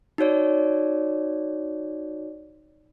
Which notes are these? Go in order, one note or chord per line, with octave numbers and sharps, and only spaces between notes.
D#4 F#4 C#5 D5